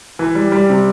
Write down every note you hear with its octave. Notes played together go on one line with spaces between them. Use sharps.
E3
G3
G3
C3